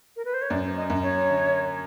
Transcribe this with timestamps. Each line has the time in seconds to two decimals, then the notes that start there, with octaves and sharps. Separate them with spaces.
0.16 A#4
0.25 B4
0.34 C5
0.42 C#5
0.50 F#2 D5
0.77 D#5
0.90 F#2
1.03 C#5
1.30 D3